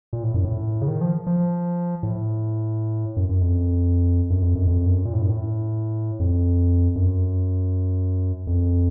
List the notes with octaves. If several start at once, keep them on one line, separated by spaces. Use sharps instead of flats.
A#2
A2
F#2
A2
C#3
D#3
F3
F3
A2
F#2
F#2
F2
F#2
F2
F#2
F2
F#2
A#2
A2
F#2
A2
F2
F#2
F2